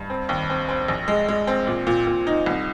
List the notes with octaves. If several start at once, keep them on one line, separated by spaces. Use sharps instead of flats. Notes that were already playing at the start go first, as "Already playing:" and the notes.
Already playing: G2
C4
D#2
C4
C4
A#1
G#3
G#3
C4
A#2
A#2
A#2
D#4
C2